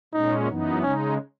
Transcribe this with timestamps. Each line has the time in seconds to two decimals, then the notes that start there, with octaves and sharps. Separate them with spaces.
0.13 A#2 G#3 C#4 D#4
0.48 F#2 E3 B3 D#4
0.82 C#3 G#3 C#4 D#4